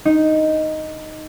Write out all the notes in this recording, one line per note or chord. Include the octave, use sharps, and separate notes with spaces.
D#4